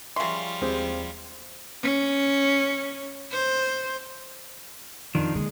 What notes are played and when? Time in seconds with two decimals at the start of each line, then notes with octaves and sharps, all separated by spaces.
0.16 C#3 F3 G3 F4 E5 C6 C#6
0.61 D#2 G#3 C4 G4
1.83 C#4
3.32 C5
5.15 F2 D#3 F3 D4
5.35 D3 G#3 A#3